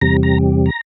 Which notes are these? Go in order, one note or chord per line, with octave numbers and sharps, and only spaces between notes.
E2 C3 G3 A#5
A#5
A#5